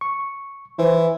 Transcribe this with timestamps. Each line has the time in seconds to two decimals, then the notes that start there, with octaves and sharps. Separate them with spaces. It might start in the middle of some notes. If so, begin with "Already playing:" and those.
0.01 C#6
0.79 E3 C5